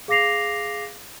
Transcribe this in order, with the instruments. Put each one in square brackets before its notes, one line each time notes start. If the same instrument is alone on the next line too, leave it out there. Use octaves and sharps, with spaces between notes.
[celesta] G#4 F5 D6 A#6 C7 F7